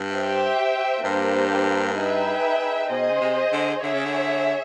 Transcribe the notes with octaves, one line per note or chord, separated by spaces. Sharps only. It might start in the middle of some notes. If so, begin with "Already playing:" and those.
Already playing: G2
G4 C5 E5 G5
G2 A#3 D4 G4 C5
D#4 G#4 B4 E5 G5
B2 G#4 C5 D#5
C#3
C3
D3
D3 G#4 C#5 E5
C#3
D3